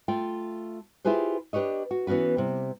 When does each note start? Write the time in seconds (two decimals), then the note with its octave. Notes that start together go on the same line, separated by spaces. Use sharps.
0.08 A3 F4 G5
1.05 E4 F4 G4 G#4 B4 C5
1.53 D4 G4 B4 C#5 D#5
1.91 F#4
2.07 E3 B3 C#4 F#4 B4
2.37 C3 G3